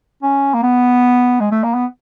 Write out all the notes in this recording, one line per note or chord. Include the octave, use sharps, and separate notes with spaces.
C#4
A#3
B3
G#3
A3
A#3
B3